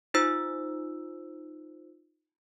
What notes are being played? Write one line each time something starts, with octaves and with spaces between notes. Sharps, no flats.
D#4 F4 C5 E6